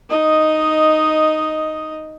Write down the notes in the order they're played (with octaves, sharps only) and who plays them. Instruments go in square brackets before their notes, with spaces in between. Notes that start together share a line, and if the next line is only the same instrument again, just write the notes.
[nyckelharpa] D#4 D#5